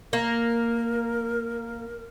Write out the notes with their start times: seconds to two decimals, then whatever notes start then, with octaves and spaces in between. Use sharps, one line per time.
0.13 A#3 A#4